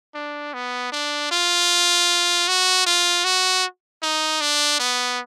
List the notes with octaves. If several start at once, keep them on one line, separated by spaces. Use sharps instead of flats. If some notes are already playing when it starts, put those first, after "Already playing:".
D4
B3
D4
F4
F#4
F4
F#4
D#4
D4
B3